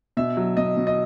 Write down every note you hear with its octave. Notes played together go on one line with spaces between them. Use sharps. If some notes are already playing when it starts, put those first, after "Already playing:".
B2 E5
F#3
B2 D#5
B2
D#5